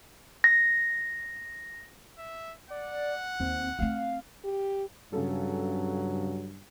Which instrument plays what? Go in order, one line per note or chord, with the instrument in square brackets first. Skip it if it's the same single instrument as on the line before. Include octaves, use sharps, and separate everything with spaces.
[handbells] A#6
[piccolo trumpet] E5
[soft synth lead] D5 [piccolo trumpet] F#5
[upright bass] D#2 [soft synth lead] C4
[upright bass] A3 C4 [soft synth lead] F5
[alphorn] G4
[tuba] G2 [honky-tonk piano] C#3 A4 [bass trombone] F#3